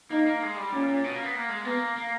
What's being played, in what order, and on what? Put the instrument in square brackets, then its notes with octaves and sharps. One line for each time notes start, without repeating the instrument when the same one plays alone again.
[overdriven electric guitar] A#3 [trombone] D#4
[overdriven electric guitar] A#3
G#3
G3
[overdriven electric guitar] A#2 [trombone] C#4
[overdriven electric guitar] A#2
B2
A#3
B3
A#3
G#3
[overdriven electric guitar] A#3 [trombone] B3
[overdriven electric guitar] A#3